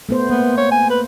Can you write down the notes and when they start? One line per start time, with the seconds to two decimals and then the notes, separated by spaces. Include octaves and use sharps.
0.09 A3 B3 C5
0.30 A#3 B3
0.58 C#5
0.71 G#5
0.90 B4